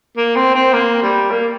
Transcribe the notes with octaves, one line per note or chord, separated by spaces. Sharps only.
A#3
C4
C4
A#3
G3
A#3